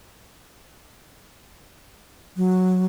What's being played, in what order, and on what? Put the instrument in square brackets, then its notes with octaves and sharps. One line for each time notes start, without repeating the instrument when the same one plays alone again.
[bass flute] F#3